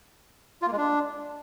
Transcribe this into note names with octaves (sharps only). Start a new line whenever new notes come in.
F4
A#3
G#3
D4